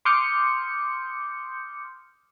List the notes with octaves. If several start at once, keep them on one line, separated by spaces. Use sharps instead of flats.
C6 D6 D#6 F6 G6 C#7